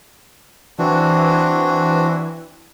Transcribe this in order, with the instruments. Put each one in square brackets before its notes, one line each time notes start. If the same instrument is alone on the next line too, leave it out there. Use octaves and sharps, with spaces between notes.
[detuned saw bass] E3 [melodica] C4 D4 F#4